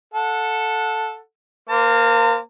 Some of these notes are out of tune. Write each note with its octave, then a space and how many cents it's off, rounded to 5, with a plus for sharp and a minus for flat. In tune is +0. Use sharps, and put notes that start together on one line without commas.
A4 +0 F#5 -25
A#3 +0 C5 -30 A#5 -45